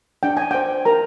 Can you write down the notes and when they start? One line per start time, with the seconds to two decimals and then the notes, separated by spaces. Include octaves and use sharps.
0.23 D4 G5
0.37 G#5
0.51 C5 G5
0.85 A#4 A#5